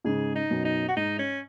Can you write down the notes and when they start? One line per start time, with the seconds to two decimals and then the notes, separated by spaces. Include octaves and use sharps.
0.05 G#2 C#3 G#4
0.36 D#4
0.50 F#2 B2
0.65 D#4
0.89 F#4
0.96 G#2 D#4
1.19 C#4